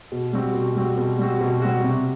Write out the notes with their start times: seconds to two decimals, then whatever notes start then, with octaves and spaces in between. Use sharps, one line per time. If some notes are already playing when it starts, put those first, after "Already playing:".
0.12 B2
0.33 G3 C4 F#4
0.55 B2
0.76 G3 C4 F#4
0.98 B2
1.19 G3 C4 F#4
1.41 B2
1.62 G3 C4 F#4
1.84 C3